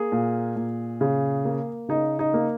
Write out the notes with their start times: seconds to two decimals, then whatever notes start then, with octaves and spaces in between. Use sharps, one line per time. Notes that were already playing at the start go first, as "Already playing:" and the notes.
Already playing: A#3 G#4
0.12 A#2
0.56 A#2
1.01 C#3
1.45 A#3
1.88 C#3 D#4
2.19 D#4
2.34 A#3